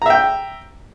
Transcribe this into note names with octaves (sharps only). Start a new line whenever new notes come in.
E5 G5 A#5